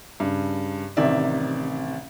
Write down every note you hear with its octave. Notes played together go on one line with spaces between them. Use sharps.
G2 C#3
A1 C3 D#3 D5 E5